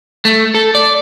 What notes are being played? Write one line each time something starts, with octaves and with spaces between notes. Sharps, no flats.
A3
A4
D5